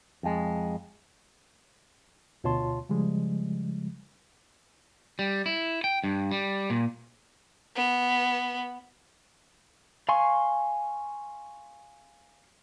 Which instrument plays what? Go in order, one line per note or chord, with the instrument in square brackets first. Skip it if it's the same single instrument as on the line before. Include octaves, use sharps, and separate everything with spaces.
[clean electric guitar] F2 G#3
[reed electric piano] D2 B2 F4 C#5 A5 C6
C#3 F3 G3 G#3
[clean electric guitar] G3
E4
G5
G2
G3
A#2
[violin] B3
[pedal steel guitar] F5 G#5 C6 C#6